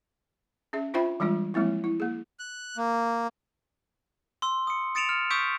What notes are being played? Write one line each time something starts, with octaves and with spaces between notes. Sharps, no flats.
C#4 G#4 E5
D4 F4 C5 E5 G5 B5
E3 G3 G#3 D4 F4
F3 G#3 A#3 C4 E4
E4
A#3 G#4
F#6
A#3
C6 E6
D#6 C#7
D#6 A6 C#7 D7 E7 F7
F6 C#7
C#6 D#6 E6 G6 B6 D7